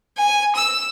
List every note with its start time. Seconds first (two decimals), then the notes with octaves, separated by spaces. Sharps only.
0.18 G#5
0.55 E6